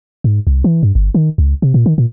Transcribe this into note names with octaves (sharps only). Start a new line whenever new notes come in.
G#2
C2
E3
G2
G1
D#3
C#2
C3
A#2
D#3
A#2